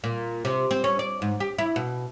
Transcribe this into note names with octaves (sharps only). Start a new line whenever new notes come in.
A#2
C3
C4
C#4
D5
G#2
G4
E4
B2